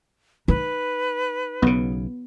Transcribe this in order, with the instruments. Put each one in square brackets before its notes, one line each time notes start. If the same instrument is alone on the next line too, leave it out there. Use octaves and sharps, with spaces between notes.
[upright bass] D#4 [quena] B4
[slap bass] B1 C#3 [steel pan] B3